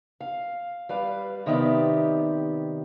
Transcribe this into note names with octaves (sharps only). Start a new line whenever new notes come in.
F5
G3 B4 F5
C3 D#3 B3 G4 D5